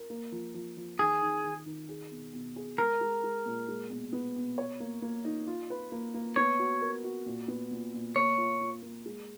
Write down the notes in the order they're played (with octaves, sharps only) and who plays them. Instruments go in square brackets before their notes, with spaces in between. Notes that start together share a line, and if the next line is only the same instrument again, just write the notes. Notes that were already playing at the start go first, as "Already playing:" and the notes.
Already playing: [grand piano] A#4
A#3
F3
F3
F3
[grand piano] D#3 [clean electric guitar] G#4
[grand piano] D#3
D#3
D#3
G#4
B2
B2
G#4
[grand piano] G#3 [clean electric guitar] A#4
[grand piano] G#3
G#3
A#2
G#3
B2
B3
B2
C#5
A#3
A#3
D#4
F4
B4
A#3
A#3
[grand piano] B3 [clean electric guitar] C#5
[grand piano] F#4
A#4
F#4
A#2
B3
A#2
A#2
[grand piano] A#3 [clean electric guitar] C#5
[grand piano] F4
F4
A#3
G#3